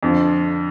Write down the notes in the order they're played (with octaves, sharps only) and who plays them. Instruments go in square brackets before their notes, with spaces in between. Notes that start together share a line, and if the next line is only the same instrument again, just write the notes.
[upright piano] F2 D3 F3